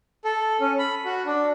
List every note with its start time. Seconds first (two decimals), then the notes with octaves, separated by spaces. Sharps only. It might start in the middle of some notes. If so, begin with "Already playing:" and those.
0.25 A4
0.60 C#4
0.79 B5
1.05 F#4
1.26 D4